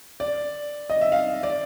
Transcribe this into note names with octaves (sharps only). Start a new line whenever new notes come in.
D5
D#5
E5
F5
D5